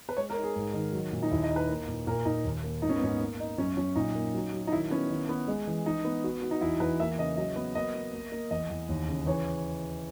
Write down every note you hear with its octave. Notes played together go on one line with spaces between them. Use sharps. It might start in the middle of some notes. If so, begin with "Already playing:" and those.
B4
G#3 C#5
A#4
D#4
G#4
G#2
D#3
F#3
A#2
D#4
D#2 E4
D#5
D#4
B4
A#3
A#2
A#2 A#4
A#2 D#4
D#2
A#3
G#2 D#4
C#4
B3
G#2 C#4
A#3
D#4
F#2 C#4
F#2 C#4
A#2 D#4
A#3
F#3
F#3
D#4
D#3 E4
B3 C#4
D#3
B3
G#3
E3
E3 D#4
B3
F#4
F#4
D#4
E2 E4
E2 B4
A#3 E5
C#3 D#5
F#3 D#5
B3
A#3 D#5
A#3
A#3
A#3
E2 D#5
E2
D#2
C#3
E3 C#5